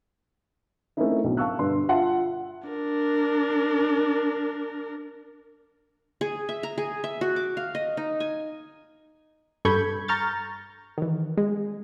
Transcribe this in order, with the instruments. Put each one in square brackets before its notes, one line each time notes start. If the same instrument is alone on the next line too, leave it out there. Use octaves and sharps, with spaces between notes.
[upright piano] A3 A#3 C4 C#4 D#4 E4
B1 D3
F5 A5 C#6 E6 F#6
G2 D3 C6
F4 E5 F#5 A5 C6
[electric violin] D4 A#4
[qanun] G#4
E5
A#5
G#4
E5
F#4
D6
F5
D#5
D#4
G#5
[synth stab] G2 A4 B5 C#6 G6 G#6
A#5 C#6 F6 G6 A6
D#3 E3
G#3